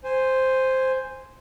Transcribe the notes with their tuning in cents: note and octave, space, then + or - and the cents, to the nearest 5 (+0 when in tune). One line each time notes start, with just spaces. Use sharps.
C5 +0 G#5 -10